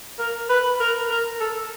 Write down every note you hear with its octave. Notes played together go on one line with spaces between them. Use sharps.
A#4
B4
A#4
A#4
A4